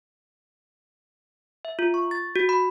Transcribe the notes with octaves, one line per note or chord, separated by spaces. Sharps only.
E5
F4
C#6
A6
F#4
B5